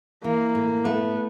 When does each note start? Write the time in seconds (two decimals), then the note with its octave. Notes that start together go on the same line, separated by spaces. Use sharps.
0.24 E3 A#3
0.55 A2
0.85 A3 B3